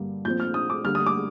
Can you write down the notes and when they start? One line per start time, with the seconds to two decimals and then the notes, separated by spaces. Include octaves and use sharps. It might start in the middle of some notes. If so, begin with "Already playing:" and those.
Already playing: G2 D3 G3 A#3
0.25 A#2 F3 C4 G6
0.40 F6
0.54 D#6
0.70 D6
0.84 D3 G3 A#3 F6
0.95 D#6
1.06 D6